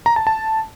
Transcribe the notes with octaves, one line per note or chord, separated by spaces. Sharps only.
A#5
A5
A5